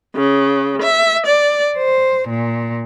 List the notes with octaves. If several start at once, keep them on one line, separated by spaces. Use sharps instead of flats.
C#3
E5
D5
C5
A#2